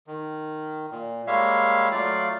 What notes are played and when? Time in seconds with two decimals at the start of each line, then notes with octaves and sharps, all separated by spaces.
0.07 D#3
0.91 A#2
1.27 G3 G#3 A#3 C#5 E5 F5
1.91 F#3 A3 F4 D5 F5